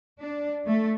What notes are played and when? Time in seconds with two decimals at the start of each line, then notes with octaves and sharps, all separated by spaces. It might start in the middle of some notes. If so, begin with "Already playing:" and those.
0.21 D4
0.66 A3